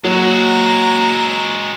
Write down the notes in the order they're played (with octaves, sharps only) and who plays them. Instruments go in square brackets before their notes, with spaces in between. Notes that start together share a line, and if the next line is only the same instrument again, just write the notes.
[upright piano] F#3 [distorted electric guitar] G#3 F#4 [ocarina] A#3 [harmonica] A#5